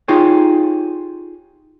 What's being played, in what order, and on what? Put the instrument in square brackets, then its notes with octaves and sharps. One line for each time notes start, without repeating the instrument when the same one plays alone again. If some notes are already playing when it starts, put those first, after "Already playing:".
[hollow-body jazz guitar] D#4 F4 G4 G#4 C#5